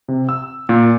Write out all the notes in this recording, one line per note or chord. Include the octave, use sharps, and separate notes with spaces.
C3
E6
A#2